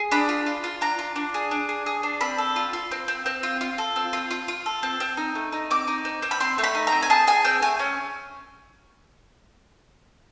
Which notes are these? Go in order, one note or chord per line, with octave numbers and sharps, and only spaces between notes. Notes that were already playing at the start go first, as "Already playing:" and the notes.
Already playing: G#4
D4 B5
F4
F4
F4
D4 A#5
F4
D4
G#4
D4
G#4
G#4
D4
C4 B5
A4
F4
F4
C4
C4
C4
F4
F4
A4
C4
F4
F4
F4
A4
C4
C4
D#4
A3
D#4
C4 D6
D#4
C4
C4
B5
C4 C6
A3
B5
D#4
A#5
C4
G#5
G#4 A5
G#4 G#5
C4 G5
A3 G#5
C#4